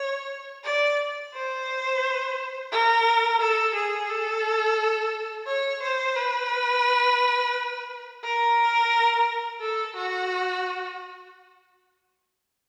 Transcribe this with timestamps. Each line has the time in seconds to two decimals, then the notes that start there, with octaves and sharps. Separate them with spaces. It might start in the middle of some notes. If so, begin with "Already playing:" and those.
Already playing: C#5
0.64 D5
1.34 C5
2.72 A#4
3.41 A4
3.75 G#4
4.09 A4
5.47 C#5
5.82 C5
6.16 B4
8.24 A#4
9.61 A4
9.96 F#4